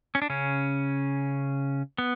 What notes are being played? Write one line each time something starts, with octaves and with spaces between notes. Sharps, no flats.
C#4
D4
C#3 C#4
B3